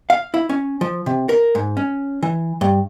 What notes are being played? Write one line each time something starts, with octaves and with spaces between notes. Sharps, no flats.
F5
E4
C#4
F3
C3
A#4
G#2
C#4
E3
G2